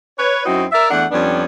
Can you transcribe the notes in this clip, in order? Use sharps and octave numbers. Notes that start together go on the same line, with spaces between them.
B4 C#5
F#2 C4 D#4 E4 F#4
A#4 D5 E5
E2 A3 D4 F#5
F2 G3 B3 C#4 D4